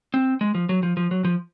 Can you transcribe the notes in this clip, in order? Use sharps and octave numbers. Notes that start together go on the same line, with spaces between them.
C4
G#3
F3
F#3
F3
F3
F#3
F3